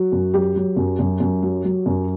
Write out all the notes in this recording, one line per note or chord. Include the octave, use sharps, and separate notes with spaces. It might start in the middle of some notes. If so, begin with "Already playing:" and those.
Already playing: F#3 F#4
F#2
F#3 G4
F#3
F#2
F#2
F#2
F#3
F#3
F#2